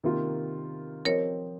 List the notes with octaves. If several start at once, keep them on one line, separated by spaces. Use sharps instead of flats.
C3 D#3 A#3 F4 A#4
F3 C4 G4 A#4 C5 C#5 D#5